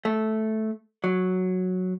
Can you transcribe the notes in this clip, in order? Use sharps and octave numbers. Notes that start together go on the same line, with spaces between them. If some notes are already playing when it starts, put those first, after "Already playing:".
A3
F#3